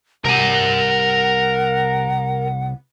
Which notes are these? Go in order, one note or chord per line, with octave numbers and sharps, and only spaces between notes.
C2 C3 A#4 F#5 G#5